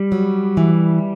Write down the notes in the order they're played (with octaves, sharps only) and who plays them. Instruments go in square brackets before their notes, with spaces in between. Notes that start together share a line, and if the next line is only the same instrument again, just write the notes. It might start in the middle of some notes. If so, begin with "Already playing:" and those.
Already playing: [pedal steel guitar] G3
[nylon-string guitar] F#3
E3